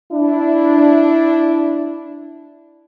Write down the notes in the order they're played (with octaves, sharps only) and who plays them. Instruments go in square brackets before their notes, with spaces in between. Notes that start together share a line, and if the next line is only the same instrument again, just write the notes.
[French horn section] D4 E4